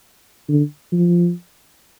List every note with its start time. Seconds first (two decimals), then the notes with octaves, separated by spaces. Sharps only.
0.49 D3
0.92 F3